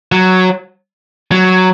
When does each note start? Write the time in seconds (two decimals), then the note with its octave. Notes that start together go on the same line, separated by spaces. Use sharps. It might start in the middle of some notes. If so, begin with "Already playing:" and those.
0.12 F#3
1.32 F#3